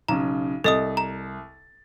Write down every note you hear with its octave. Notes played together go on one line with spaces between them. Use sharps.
B1 C#3 A#5
C2 A4 D#5 D#6 A6
A#5